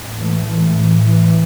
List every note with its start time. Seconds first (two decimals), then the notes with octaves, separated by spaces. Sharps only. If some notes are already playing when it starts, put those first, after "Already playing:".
Already playing: A1 A2
0.18 E3 A3
0.46 E3 A3
0.74 E3
1.03 E3